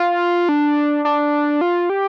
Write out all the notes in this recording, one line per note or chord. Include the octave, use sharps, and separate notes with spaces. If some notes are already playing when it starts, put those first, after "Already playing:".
Already playing: F4
D4
D4
F4
G4